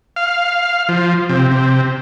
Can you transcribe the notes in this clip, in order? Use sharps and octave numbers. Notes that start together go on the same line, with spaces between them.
F5
F3
C3
C3